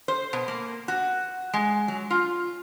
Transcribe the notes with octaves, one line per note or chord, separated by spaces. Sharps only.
C5
B2
A#3
F#4
G#3
F#3
F4